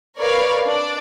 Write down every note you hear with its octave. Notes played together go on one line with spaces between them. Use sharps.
A#4 B4 C#5 D5 F5
D4 D5